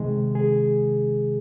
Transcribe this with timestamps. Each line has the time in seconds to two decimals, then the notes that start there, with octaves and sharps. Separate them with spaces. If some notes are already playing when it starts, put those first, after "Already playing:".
Already playing: C3 D#3 G#3
0.35 G#4